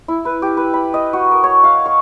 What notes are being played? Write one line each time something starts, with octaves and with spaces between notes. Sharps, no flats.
E4
B4
G4
B4
B5
D#5
F#4
A#4
C#5
F5
C#6